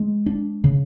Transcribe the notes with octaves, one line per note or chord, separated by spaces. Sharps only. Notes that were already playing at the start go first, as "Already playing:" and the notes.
Already playing: G#3
D4
C#3